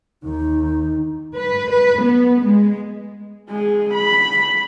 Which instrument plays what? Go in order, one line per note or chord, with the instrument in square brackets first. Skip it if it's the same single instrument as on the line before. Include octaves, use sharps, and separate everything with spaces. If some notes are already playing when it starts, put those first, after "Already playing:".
[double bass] D#2 D#3 [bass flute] D#4
[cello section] B4
B4
B3
G#3
[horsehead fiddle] G#3 G#4
B5